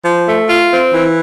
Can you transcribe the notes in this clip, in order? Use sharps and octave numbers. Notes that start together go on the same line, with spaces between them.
F3
A3
F4
C4
E3